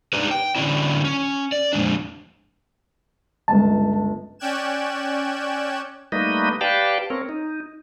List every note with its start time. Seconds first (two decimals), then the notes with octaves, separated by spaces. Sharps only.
0.13 D4 D#4 G4 B4
0.31 G5
0.56 D3 F#3 C#4 D4 E4
1.05 C#4
1.52 D5
1.73 F2 A#2 C#3 G#3 D4
3.48 G1 C#2 A5
4.39 C#4 D5 G5 F#6 G#6 E7
6.12 G3 A3 A#3 D#4 B4 D#5
6.61 G4 B4 D5 F5 G5 A5
7.10 C4 A#4 C#5
7.29 D#4